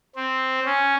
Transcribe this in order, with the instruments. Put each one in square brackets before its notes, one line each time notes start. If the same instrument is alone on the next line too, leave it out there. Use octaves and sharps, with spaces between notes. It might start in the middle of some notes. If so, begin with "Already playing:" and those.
[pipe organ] C4
C#4